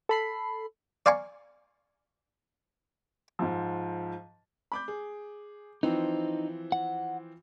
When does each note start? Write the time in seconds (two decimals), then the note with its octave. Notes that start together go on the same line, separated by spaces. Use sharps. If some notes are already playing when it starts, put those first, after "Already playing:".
0.09 A4 B5 C7
1.06 D5 F5 G#5 A#5 C#6
3.39 G#2 F3
4.72 B5 D6 G6
4.88 G#4
5.83 E3 F3 C4 D#4
6.72 F#5